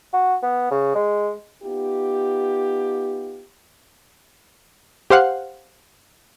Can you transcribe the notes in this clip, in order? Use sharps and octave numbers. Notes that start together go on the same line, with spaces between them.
F#4
B3
C#3
G#3
B3 D#4 F4 G4
G4 C5 F5 F#5